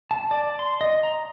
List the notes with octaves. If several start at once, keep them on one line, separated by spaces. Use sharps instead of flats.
A5
D5
C6
D#5
A#5